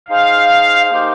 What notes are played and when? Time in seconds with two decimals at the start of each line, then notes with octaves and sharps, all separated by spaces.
0.09 D#4 G#4 C5 F5
0.91 A#3 D#4 G4 C5